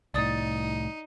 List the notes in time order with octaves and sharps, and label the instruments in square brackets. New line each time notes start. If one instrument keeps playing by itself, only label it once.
[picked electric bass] C2 A2 [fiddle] D#4 [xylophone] D5 D#6 A6